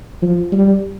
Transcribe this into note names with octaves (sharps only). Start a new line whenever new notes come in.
F3
G3